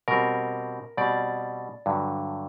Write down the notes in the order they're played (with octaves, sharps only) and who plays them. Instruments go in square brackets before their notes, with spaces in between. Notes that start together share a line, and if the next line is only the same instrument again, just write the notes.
[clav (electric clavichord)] B2 G3 C4 A#4
B2 G3 C4 D5
G2 D3 F#3